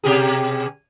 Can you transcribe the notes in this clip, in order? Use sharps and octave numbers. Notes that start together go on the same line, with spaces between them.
B2 G4 G#4